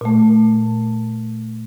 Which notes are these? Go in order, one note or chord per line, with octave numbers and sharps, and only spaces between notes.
A#2 A3